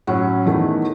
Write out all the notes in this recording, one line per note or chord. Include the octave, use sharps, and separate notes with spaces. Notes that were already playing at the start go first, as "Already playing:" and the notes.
A2 F#3 C#4 E4 F#5
E2 D#3 A3 E4